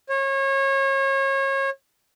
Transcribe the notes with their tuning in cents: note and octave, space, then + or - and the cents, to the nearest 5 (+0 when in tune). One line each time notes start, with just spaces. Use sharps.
C#5 -30